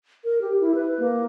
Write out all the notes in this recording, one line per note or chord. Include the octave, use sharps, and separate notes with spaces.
A#4
G4
E4
B4
A#3